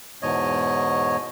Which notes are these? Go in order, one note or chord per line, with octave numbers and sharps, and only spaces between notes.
E2 G#2 B2 C#5 D#5